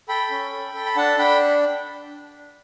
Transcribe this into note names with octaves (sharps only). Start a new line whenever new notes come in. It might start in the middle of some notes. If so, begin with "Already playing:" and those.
A4 G5 B5
C#4
A4
A4
B5
D4 F#5 A5
D4 G5 B5